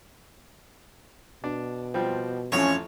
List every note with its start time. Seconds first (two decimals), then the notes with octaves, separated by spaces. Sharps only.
1.44 B2 D4
1.94 F3 G3 C4
2.52 A1 F2 C#4 C#5